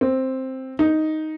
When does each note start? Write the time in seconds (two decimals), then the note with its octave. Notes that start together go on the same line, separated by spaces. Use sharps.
0.01 C4
0.79 D#4